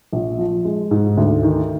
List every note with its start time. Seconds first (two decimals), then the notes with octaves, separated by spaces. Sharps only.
0.13 A#1
0.38 F3
0.65 G#3
0.91 G#2
1.17 D2
1.43 D#3